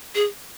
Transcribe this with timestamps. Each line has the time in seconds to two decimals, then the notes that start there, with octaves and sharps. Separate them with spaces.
0.15 G#4